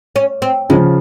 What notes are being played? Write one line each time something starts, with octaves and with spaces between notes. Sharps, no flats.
C#4
C4
C#3 F3 G#3